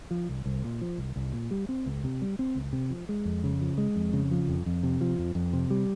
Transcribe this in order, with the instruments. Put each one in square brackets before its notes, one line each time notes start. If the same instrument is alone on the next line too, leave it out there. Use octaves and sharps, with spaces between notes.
[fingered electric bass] F3
C2
C2
A#2
F3
C2
C2
A#2
G3
C4
C#2
C3
G3
C4
C#2
C3
F3
G#3
F2
C#3
F3
G#3
F2
C#3
F3
F2
F2
C3
F3
F2
F2
C3
G3